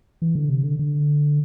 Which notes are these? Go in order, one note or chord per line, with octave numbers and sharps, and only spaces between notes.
E3
D3
C3
D3
D3